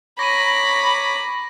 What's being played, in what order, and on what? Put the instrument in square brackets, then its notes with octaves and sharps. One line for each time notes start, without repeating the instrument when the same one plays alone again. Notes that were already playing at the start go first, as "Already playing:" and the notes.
[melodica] C#5 A#5 D6 [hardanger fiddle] B5 [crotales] A#6 D#7